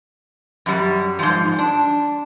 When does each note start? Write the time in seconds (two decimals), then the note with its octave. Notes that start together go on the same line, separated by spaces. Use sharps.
0.66 F#2 G3
1.19 G#2 F3
1.59 D4